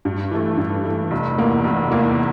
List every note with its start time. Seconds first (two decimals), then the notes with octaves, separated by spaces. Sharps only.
0.05 G2
0.31 E3 A3
0.57 G2
0.85 E3 A3
1.11 F1
1.38 E2 E3 A#3
1.64 F1
1.91 E2 E3 A#3